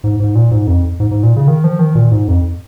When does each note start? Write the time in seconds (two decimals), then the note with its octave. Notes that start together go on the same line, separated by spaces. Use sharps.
0.04 G#2
0.20 G#2
0.35 A#2
0.51 G#2
0.67 F2
1.00 G#2
1.11 G#2
1.23 A#2
1.36 C#3
1.48 D#3
1.64 F3
1.79 D#3
1.95 A#2
2.12 G#2
2.28 F2